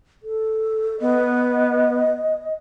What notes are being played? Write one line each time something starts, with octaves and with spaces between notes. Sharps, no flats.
A4
B3 D#5